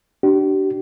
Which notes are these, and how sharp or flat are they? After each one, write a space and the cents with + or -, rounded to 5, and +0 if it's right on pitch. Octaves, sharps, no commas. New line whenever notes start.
D4 +0 G4 -40